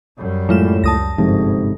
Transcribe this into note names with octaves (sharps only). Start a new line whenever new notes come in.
F#2 G3
A2 F#3 G#3 F4 E7
C#2 A5 D#6 A#6
G1 G#2 C3 F3